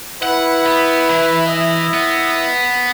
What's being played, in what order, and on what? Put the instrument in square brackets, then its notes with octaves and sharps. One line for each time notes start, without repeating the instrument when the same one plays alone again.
[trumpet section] E4 B4 [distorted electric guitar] F#5
[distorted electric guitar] B3
E3
[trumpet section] E4 D#5 E5
[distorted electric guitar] B3